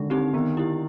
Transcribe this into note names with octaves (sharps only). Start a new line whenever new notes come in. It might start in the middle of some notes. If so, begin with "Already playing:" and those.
Already playing: D3 D#3 G#3
C4 D#4 G4
D#3 B3
E4 G4